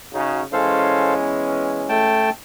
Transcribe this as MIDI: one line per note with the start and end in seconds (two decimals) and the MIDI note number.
0.14 0.43 49
0.14 0.43 63
0.14 0.43 66
0.53 2.32 52
0.53 2.32 56
0.53 2.32 61
0.53 1.14 69
0.53 1.14 72
0.53 1.14 77
1.20 1.83 59
1.89 2.30 57
1.89 2.30 79
1.89 2.30 81